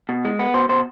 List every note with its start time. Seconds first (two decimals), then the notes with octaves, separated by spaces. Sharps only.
0.09 B2
0.25 G#3
0.39 B3
0.54 B2 C5
0.69 B2 C5